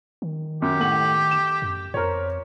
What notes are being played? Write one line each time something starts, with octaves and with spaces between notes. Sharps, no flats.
D#3
F#2 G4
A2 F#5 F#7
E7
F#2
F2 A#4 C5 C#5